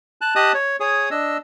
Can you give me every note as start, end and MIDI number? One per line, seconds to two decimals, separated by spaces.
0.21 0.34 81
0.21 0.34 90
0.36 0.52 67
0.36 0.52 75
0.36 0.52 81
0.36 0.52 87
0.36 0.52 90
0.54 0.76 73
0.80 1.09 68
0.80 1.09 73
0.80 1.09 87
1.11 1.37 62
1.11 1.37 75
1.11 1.37 88